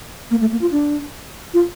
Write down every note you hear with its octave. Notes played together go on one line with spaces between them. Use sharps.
A#3
A3
A#3
F4
D4
F4